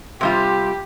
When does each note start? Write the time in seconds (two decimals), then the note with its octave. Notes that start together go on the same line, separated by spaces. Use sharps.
0.21 C3 G3 F4 G4